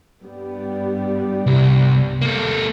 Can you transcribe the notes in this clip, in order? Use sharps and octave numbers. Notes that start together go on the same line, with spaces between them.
G2 G3 B3
C2
A#3 A4